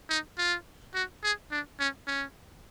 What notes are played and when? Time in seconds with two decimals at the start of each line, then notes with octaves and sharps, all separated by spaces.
0.10 D#4
0.38 F4
0.94 F#4
1.23 G#4
1.51 D4
1.79 C#4
2.07 C#4